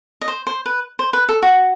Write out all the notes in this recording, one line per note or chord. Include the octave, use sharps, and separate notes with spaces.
D#5
C5
C5
B4
C5
B4
A4
F#4